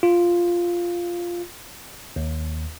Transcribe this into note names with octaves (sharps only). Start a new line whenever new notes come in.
F4
D#2